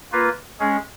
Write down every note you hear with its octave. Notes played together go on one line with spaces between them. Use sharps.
A#3 F4 B4
G#3 C#4 G#4